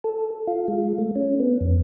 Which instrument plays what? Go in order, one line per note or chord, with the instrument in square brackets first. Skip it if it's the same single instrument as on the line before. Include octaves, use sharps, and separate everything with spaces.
[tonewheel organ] A4
F4
G#3
A3
C#4
B3
F2